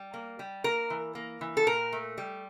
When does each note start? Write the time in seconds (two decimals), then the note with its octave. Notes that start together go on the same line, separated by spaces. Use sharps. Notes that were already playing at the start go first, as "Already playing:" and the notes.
Already playing: G3
0.14 A#3
0.39 G3
0.64 A#3 A#4
0.90 E3
1.15 A#3
1.41 E3
1.57 A4
1.66 A#2 A#4
1.92 A3
2.18 G3